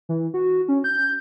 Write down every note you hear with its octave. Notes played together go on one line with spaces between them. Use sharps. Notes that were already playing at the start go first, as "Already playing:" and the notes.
E3
F#4
C#4
G6